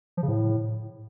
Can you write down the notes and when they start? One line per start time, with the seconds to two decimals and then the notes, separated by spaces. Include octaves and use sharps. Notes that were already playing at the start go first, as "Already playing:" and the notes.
0.17 F3
0.23 C#3
0.28 A2